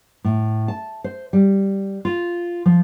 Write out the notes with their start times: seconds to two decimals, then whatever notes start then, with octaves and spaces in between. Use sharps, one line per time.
0.24 A2
0.68 A5
1.04 C5
1.33 G3
2.05 F4
2.66 F3